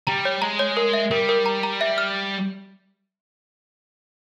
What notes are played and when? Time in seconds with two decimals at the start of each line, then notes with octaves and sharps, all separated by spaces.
0.07 G3 A#5
0.25 C#5
0.42 G#3 A#5
0.59 C#5
0.77 A#4
0.93 E5
1.11 G3 A#4
1.29 A#4
1.46 A#5
1.63 A#5
1.81 E5
1.98 F6